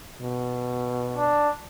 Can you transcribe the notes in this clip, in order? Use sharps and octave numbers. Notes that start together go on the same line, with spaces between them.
B2
D4